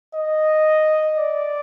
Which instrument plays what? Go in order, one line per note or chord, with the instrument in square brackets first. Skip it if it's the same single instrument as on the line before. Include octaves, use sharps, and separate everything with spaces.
[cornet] D#5
D5